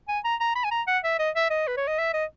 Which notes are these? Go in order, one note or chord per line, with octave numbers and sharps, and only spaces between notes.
G#5
A#5
A#5
B5
G#5
A#5
F#5
E5
D#5
E5
D#5
B4
C#5
D#5
E5
D#5